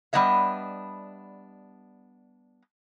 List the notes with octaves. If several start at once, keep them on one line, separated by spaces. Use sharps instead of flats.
G3 B3 D4 D#5 E5